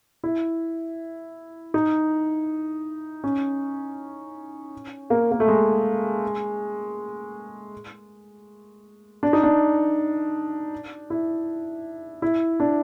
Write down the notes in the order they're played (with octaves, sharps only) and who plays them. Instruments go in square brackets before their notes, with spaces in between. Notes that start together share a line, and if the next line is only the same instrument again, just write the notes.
[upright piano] E4
D#4
C#4
A#3
A#3
A3
G#3
D4
D#4
D4
E4
E4
D4